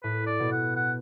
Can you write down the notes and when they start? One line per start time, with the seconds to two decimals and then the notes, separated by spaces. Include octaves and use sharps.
0.03 A2 B4
0.27 D5
0.40 B2
0.52 F#5
0.76 F#5